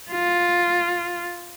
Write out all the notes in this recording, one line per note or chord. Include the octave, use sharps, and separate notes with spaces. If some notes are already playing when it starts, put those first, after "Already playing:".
F4